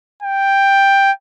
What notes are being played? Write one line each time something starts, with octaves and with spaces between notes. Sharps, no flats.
G5